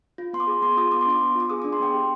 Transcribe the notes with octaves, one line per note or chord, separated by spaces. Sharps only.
F4
B3 C6
D6
G#4
B3 C6
F4 D#6
B3 D6
C6
D4 D6
B3
F4 D6
G#4 D#6
D4 D6
C6
B3 G5
G4